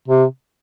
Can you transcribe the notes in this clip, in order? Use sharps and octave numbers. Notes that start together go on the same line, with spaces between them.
C3